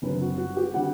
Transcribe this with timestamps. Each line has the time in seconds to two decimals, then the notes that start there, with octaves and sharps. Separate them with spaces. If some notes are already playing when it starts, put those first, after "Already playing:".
0.02 F#1 F#2 D3 G3 C4 B4
0.21 F#4
0.38 F#4
0.57 G4
0.74 D3 G3 C4 F#5